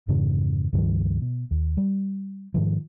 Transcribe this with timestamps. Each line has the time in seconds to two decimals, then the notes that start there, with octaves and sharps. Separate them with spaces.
0.08 F2 G#2 C#3 E3
0.73 C#2 G2 D#3 F3
1.22 B2
1.51 D#2
1.77 G3
2.54 G#2 D#3 F3